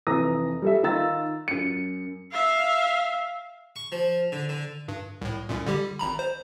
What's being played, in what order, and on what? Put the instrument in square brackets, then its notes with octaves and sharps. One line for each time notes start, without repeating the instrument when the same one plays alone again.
[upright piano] F1 E3 A#5 D#6 A#6
G3 A4 E5
D#3 D#4 F4 A#5 E6 A6
F#2 C#7
[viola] E5 F5
[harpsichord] C#6
F3
D3
D3
[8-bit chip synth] G2
C2 A2
C2 F#2 A#2
D3 G3 G4
G#1 A#5 B5
C5